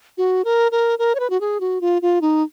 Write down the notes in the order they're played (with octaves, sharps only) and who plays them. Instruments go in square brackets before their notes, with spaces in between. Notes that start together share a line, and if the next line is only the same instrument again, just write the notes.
[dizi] F#4
A#4
A#4
A#4
C#5
B4
F#4
G#4
F#4
F4
F4
D#4